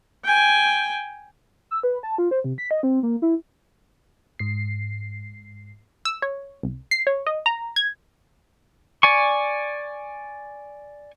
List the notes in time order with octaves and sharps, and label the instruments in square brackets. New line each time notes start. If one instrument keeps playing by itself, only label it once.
[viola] G5 G#5
[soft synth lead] E6
B4
A5
F4
C5
C3
B6
D#5
C4
A#3
E4
[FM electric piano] G#2 C7
[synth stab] E6
C#5
C2
C7
C#5
D#5
A#5
G#6
[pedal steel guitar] D5 G#5 C#6